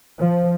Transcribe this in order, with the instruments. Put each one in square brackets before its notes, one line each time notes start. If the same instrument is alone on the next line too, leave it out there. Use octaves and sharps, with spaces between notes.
[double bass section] F3